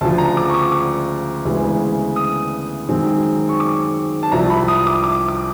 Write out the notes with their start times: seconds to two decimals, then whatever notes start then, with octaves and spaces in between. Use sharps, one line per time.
0.01 D2 C#3 F3 A5
0.18 A#5
0.37 D6
0.50 C#6
0.54 D6
0.72 D6
1.45 D2 C#3 E3 G#3 B3
2.16 D#6
2.89 F#2 D#3 G#3 C4
3.49 C#6
3.60 D6
4.23 A5
4.32 C2 C3 F3 A#5
4.50 B5
4.68 D#6
4.87 D6
5.04 D6
5.28 D6